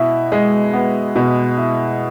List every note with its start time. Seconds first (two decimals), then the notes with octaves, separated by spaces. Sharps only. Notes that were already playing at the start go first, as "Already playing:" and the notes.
Already playing: B2 E4
0.32 G#3
0.74 B3
1.16 B2
1.57 E4